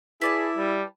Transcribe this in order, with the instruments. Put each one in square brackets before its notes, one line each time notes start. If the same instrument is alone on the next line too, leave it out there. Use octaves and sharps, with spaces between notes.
[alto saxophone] E4 [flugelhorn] G#4 [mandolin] B4 D5 A5
[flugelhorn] G3